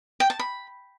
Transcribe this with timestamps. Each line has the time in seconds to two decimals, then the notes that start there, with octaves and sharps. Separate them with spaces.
0.20 G5
0.30 A5
0.39 B5